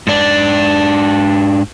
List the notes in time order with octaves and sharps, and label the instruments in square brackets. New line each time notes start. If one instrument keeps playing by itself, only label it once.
[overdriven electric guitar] G#2 D4